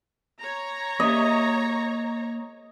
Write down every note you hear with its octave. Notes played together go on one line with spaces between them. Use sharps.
C#5 A#5
A#3 D#5 E5